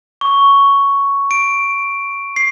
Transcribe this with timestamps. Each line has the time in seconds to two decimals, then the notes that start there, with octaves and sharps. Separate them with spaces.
0.21 C#6
1.31 D7
2.36 C7